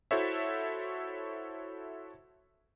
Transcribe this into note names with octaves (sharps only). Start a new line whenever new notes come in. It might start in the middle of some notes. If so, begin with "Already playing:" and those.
E4 F#4 A4 C5 C#5 E5